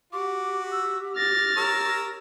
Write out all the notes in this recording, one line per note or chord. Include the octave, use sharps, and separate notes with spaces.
F#4 G4 D6
E6
F6 A6 A#6
A#4 C#5 E6